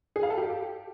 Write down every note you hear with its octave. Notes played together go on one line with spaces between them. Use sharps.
G#4
F5
A4
G4